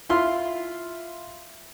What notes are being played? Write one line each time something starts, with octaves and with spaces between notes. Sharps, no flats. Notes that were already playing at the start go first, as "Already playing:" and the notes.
E4 F4 C6